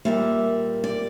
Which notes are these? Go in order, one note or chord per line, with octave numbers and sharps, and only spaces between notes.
A#2 G3 A#3 E5
D5